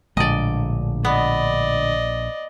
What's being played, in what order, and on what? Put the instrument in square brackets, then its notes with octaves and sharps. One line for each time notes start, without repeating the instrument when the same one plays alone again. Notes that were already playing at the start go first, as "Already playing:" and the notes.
[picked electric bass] A#1 [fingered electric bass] A2 D3 G#3 [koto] D5 D#5
[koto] B3 [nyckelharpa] D5 D#5